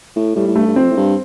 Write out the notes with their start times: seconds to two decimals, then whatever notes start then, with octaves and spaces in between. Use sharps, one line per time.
0.16 A2
0.36 A2 G3
0.47 A2
0.56 G2 A3
0.67 G2
0.76 F2 C4
0.90 A2
0.97 G2